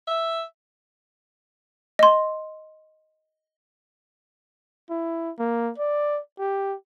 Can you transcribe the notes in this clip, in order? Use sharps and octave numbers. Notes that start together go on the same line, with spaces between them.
E5
D#5 C6
E4
A#3
D5
G4